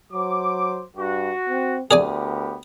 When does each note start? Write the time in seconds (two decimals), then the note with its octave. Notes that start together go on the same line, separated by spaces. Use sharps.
0.12 F#3 C5 D6
0.97 G2 F#4
1.49 C4
1.91 D2 B3 G4 G#4 A#4 D5 G#5